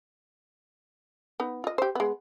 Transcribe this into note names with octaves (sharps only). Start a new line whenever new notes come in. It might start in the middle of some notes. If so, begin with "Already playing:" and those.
B3 D#4
F4 D#5
G4 C5
G#3 B3